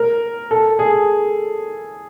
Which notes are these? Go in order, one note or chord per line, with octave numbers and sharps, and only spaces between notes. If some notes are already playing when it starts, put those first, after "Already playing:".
Already playing: A#4
A4
G#4